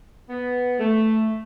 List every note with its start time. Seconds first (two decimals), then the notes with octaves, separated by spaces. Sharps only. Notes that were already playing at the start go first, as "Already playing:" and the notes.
0.29 B3
0.80 A3